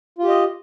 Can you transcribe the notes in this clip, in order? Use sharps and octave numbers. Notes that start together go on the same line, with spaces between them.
F4 G4 D#5